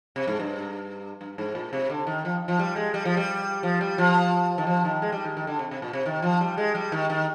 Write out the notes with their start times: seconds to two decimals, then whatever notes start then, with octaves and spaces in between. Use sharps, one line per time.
0.16 C3
0.27 G#2
0.40 G2
1.21 G2
1.38 G#2
1.55 A#2
1.73 C3
1.90 D3
2.07 D#3
2.25 F3
2.48 F3
2.59 G3
2.76 G#3
2.94 G3
3.05 F3
3.17 G3
3.63 F3
3.81 G3
3.98 F3
4.58 D#3
4.67 F3
4.85 D#3
5.02 G#3
5.12 G3
5.24 D#3
5.37 D#3
5.47 D3
5.59 C3
5.71 C3
5.82 A#2
5.93 C3
6.06 D#3
6.22 F3
6.41 G3
6.58 G#3
6.75 G3
6.92 D#3
7.10 D#3